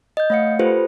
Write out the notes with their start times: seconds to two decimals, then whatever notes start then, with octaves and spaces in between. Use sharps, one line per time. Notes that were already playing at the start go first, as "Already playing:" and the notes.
0.17 D#5 G6
0.30 A3 C#5 F5 F#5 C#7
0.59 F4 G4 A4 B4 C5